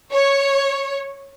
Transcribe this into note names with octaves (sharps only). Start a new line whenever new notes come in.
C#5